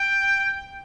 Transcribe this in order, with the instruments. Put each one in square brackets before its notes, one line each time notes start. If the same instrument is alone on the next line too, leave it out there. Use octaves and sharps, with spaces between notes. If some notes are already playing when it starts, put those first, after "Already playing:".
Already playing: [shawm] G5